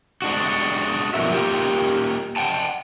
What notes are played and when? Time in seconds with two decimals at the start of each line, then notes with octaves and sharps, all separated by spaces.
0.22 G#3 D4 F#4
1.14 G2 B2 F3 F#4 A#4 E5
1.32 A#3 F4 G4
2.36 F#5 G5 A5